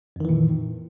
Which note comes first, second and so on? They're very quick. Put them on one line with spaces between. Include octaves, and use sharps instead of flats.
F2 D#3 E3 A#2